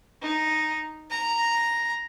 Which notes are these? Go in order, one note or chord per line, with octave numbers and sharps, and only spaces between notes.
D#4
A#5